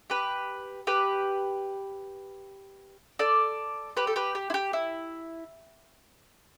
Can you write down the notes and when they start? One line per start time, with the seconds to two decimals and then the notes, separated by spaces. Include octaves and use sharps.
0.10 G4 B4
0.87 G4 B4
3.19 A4 D5
3.97 G4 B4
4.07 A4
4.16 G4 B4
4.35 G4
4.50 E4
4.54 G4
4.73 E4